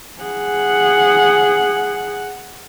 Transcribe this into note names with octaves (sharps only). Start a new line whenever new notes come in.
G#4 F#5